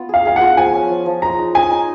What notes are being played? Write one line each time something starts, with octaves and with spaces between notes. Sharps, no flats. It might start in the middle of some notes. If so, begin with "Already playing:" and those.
Already playing: B3 F4
G#4 F5
G#4 F5
F#5
F4
F3 G#5
C#4
F3
F3
G#3 A#5
D#4
D#5 G#5
D#4